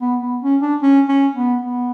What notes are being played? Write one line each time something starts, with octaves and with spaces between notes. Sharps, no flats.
B3
B3
C#4
D4
C#4
C#4
B3
B3